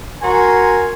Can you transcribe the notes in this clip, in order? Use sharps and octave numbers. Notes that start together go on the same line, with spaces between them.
F#4 A#4 G#5 A#5 C6